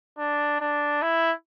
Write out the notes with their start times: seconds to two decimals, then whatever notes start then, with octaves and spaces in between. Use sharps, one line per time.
0.18 D4
0.60 D4
1.02 E4